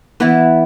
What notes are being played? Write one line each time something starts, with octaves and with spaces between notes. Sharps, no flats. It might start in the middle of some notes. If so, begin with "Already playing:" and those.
E3 B3 E4